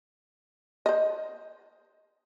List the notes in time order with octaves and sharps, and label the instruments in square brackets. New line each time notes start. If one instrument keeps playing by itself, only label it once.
[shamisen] C5 D#5